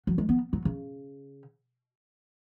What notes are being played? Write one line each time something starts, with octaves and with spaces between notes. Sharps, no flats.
F#3
G#3
B3
F#3
C#3